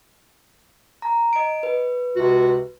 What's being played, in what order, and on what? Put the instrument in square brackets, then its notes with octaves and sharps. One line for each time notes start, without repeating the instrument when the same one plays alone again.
[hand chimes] A#5
D#5 D7
B4
[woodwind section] C#2 C3 F#4